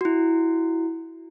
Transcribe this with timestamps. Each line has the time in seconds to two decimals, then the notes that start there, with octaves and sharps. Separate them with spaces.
0.01 E4 F#4